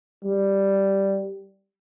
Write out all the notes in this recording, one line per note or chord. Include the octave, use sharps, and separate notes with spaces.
G3